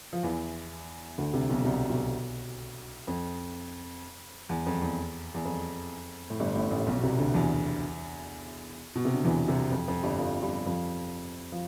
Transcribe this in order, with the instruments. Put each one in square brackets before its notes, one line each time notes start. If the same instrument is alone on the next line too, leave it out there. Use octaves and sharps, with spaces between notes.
[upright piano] F3
E2 E3
D2 D3
C2 C3
B1 B2
D3
C2 C3
B1 B2
F2
E2
F2
E2
E2
F2
A2
G1 G2
A1 A2
A1 A2
B1 B2
B2
C2 C3
D2 D3
E2 E3
B2
C3
D3
E2 E3
C2 C3
F2
F2
G1 G2
F2 F3
G2 G3
F2 F3
F3